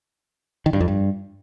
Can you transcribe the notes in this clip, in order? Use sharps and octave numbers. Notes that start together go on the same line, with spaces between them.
D#3
G2
F2
G2